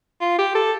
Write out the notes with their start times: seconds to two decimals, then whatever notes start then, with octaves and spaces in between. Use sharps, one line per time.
0.21 F4
0.38 G4
0.55 A4